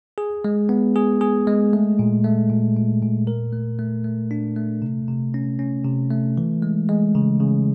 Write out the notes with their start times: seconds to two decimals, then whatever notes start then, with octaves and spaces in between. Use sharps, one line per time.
0.18 G#4
0.45 G#3
0.69 B3
0.96 G#4
1.21 G#4
1.47 G#3
1.73 A3
1.99 A#2
2.24 A3
2.50 A#2
2.77 A#2
3.02 A#2
3.27 A#4
3.53 A3
3.79 A3
4.04 A3
4.31 D4
4.56 A3
4.82 C3
5.08 C3
5.34 C#4
5.59 C#4
5.85 C3
6.11 A3
6.37 E3
6.62 G#3
6.89 G#3
7.15 C#3
7.40 C#3